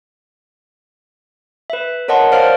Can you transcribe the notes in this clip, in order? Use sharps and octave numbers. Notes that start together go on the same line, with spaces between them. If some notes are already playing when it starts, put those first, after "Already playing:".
B4 E5
A#4 C#5 D#5 F#5 A5 C6
C5 D5 F5 F6 D7